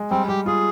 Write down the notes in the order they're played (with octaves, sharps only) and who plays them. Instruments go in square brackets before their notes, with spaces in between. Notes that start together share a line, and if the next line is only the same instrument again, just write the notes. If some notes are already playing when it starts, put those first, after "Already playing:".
Already playing: [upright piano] G#3
[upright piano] G3 [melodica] C4
[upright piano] G3 [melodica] G4
[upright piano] F4 [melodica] G#4